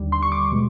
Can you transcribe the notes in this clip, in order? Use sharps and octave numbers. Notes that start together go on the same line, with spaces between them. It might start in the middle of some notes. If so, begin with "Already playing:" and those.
Already playing: D#2 D3 G3
C6
C#6
D6
B2 G#3